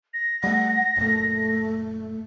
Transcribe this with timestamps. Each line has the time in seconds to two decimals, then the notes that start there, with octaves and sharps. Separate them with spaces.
0.14 A#6
0.44 G3 A3 F#5
0.97 F#1 A#2 A3